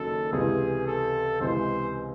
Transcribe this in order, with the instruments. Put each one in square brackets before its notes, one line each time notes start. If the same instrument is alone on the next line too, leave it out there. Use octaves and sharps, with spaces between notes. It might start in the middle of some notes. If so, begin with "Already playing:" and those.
Already playing: [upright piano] F#1 F#2 D#3 [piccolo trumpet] A4
[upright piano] C#2 C3 E3 [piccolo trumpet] G#4
[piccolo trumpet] A4
[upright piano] C#2 C3 E3 G#3 [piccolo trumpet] C5